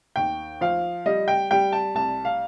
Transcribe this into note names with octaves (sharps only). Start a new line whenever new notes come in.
D#2 G5
F3 F5
G3 D#5
G5
G3 G5
A5
C2 A5
F5